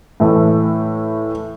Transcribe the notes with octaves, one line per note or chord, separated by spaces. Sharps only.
A2 E3 A3